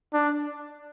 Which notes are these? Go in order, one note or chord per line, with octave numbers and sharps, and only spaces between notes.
D4